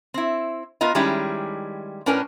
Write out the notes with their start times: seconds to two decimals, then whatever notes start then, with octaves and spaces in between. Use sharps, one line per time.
0.14 C4 E4
0.81 B3 F4 A#4 D#5
0.95 D#3 G3 G#3 C#4 E4 G4
2.06 A2 C#4 D4 A#4 B4 G#5